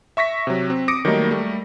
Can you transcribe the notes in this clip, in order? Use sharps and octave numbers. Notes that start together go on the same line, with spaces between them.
E5 C#6 A#6 B6
C3 F#3
C4
D6 D#6 A#6 C#7 D7
D#3 F#3 G3 A3 A#3 D#4
G3 A3